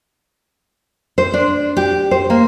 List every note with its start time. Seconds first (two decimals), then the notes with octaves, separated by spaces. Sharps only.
1.18 C5
1.34 D4
1.77 G4
2.11 C5
2.30 A#3